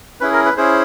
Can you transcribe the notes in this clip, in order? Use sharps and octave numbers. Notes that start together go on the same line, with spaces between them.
C#4 E4 G#4 B4
A#4
B4
C#4 E4 G#4 C5